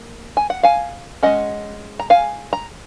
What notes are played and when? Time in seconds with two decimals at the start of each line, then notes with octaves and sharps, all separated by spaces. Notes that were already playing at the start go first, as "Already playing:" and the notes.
Already playing: A#3
0.37 G#5
0.50 F#5
0.63 F5 G#5
1.23 G#3 C#4 D#5 F#5
1.99 A#5
2.10 F5 G#5
2.53 A#5